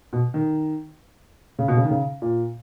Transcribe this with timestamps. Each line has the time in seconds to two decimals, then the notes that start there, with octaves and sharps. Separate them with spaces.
0.13 B2
0.34 D#3
1.59 C#3
1.68 B2
1.77 C#3
1.84 D#3
1.91 C#3
2.22 A#2